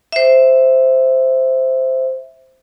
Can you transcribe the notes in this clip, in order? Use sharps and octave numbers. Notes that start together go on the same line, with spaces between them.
C5 E5